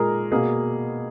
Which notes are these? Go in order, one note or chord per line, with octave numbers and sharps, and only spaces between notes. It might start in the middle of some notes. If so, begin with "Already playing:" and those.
Already playing: A#2 G#3 G#4 A#4
B2 A#3 G#4